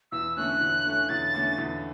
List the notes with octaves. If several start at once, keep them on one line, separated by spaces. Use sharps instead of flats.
E2 E6
D3 A3 C#4 F#6
E2
D3 A3 C#4
E2 A6
D3 A3 C#4
E2